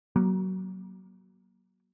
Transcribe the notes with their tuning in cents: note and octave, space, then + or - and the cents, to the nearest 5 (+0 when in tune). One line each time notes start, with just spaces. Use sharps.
F#3 +20 A#3 +25